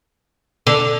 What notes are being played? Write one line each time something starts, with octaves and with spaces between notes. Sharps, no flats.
D3